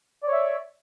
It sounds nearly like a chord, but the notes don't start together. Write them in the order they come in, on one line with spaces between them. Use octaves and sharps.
D5 C#5 E5